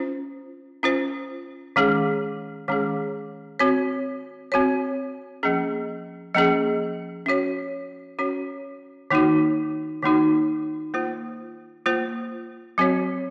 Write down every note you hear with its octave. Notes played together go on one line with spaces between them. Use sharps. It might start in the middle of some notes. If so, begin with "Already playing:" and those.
Already playing: C#4 F4 C5
C#4 F4 C5
D#3 G#3 C#4 G#4
D#3 G#3 C#4 G#4
C4 F#4 C#5
C4 F#4 C#5
F3 A#3 C#4 G#4
F3 A#3 C#4 G#4
C#4 F#4 C#5
C#4 F#4 C#5
D#3 A#3 D#4 F#4
D#3 A#3 D#4 F#4
A#3 F4 C5
A#3 F4 C5
F#3 C4 F#4 C#5